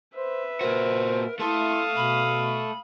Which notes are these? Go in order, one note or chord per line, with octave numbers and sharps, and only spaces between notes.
B4 C5 E5
A#2 F#4 A#4 C5
A3 E4 A4 F5 C6 D#6
B2 B5